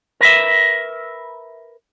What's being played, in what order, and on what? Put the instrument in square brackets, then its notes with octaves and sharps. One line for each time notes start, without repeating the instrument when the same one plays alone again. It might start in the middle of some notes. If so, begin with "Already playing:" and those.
[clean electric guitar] A#4 B4 E5